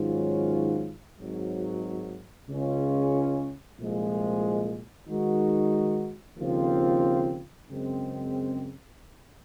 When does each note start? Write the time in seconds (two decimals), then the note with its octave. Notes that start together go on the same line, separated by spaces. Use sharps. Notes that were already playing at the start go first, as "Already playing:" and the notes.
Already playing: G#2 D#3 F#3 C#4 F4
1.18 G#1 G#2 F#3
2.48 C#2 C#3 G#3 C#4 F4
3.77 C2 A#2 F3 G#3
5.07 D#3 G#3 D#4 F#4
6.37 D#2 C#3 F3 C4 F4
7.67 F#2 C#3 G#3 C4